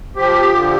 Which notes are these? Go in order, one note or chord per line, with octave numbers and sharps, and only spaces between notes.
F3 G4
D3